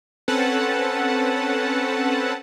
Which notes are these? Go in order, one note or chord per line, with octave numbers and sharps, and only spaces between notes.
C4 C#4 A4 B4 F#5 A5